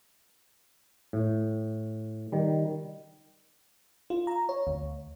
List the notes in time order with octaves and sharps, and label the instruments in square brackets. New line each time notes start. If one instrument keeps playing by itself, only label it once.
[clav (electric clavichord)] A2
D#3 G3
[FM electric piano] F4
A#5
C#5
D2